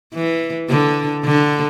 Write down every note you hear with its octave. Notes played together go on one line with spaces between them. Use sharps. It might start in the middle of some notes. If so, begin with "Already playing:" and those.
E3
D3
D3